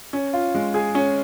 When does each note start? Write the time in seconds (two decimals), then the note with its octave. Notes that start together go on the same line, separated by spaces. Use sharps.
0.13 C#4
0.33 F4
0.54 G#3
0.74 G#4
0.95 C#4